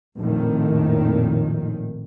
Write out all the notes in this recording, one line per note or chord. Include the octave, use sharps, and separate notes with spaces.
A#1 F2 A2 D#3